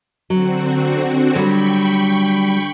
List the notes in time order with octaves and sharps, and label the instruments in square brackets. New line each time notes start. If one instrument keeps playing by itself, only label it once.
[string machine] D3 C4 F#4 [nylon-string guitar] F#3
[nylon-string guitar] D3 [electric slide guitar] F#3 G3 [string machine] G5 B5 C#6